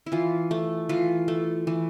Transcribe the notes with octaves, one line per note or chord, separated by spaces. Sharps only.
E4
E3 F4
A3
E3 F4
A3
E3